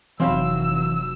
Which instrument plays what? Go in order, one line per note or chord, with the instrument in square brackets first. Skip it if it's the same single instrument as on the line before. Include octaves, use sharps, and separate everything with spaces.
[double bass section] F1 F#3 [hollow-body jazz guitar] E3 C#5 B5 [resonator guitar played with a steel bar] C4 F5 [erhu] E6